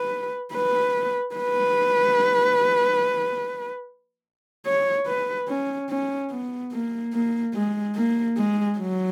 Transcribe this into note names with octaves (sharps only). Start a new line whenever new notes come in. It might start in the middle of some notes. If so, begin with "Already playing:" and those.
Already playing: B4
B4
B4
C#5
B4
C#4
C#4
B3
A#3
A#3
G#3
A#3
G#3
F#3